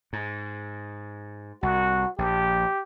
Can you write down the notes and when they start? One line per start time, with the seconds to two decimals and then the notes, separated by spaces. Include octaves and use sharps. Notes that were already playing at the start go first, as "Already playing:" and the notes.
0.13 G#2
1.63 C2 F#4
2.18 A#1 G4